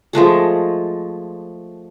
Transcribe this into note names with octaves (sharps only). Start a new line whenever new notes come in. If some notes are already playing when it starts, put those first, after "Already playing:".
F3 G#3 A3 G#4